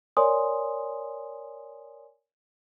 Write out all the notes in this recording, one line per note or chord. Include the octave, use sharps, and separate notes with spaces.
A#4 C#5 D5 G#5 C6 D#6